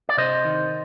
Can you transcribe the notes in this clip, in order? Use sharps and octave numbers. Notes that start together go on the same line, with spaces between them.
D5
C3 C5 D#5
D#3